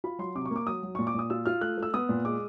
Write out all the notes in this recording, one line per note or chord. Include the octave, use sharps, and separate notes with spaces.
F4 B5
F#3 C6
C3 D6
C#6
A#3 D6
F#3 D#6
F#3
A#2 C#6
D6
A#2 D#6
F4 E6
F4 F6
A3 F#6
A3 E6
B3 D#6
A#2
G#3 D6